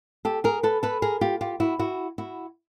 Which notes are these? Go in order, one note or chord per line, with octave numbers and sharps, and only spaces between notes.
G4 A4
G#4 A#4
A4 B4
A4 B4
G#4 A#4
F4 G4
F4 G4
E4 F#4
E4 F#4
E4 F#4